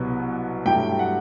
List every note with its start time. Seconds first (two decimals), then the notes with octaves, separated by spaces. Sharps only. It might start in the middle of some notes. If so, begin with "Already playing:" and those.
Already playing: C2 B2 F#3 B3
0.65 G2 F#3 A3 E4 G5
0.99 F#5